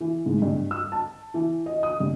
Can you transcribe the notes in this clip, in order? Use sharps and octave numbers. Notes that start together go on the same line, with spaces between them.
E3
G#2
G2
E6
A5
E3
D#5
D#6
G2